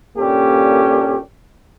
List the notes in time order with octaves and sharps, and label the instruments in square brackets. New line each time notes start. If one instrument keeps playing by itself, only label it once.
[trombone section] G2 A#2 A#3 C#4 G4 A4